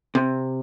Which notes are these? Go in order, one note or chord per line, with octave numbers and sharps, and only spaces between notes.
C3